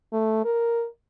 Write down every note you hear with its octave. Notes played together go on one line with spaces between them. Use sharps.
A3
A#4